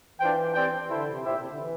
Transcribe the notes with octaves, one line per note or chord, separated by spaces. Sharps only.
E3 D4 F4 C5 G5
C4 G4 D5 G5
E3
D3 E4 A4 C5
C3
A#2 E4 G4 C5 E5
C3
D3
E3